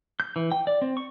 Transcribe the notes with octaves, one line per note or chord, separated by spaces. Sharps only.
G6
E3
G5
D5
C4
C#6